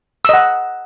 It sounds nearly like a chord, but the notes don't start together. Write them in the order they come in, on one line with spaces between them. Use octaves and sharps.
E6 D#5 F#5